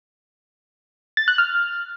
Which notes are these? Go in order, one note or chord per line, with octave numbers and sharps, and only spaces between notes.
A6
F#6
F6